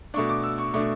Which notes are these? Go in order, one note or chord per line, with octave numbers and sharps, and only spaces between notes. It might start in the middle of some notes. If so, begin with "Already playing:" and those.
B2 A3 D4 C#6
D6
E6
C#6
B2 A3 D4